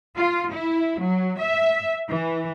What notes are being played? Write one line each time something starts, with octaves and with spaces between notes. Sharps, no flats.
F4
E4
F#3
E5
E3